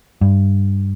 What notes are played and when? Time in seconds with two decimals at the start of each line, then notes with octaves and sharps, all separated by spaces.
0.21 G2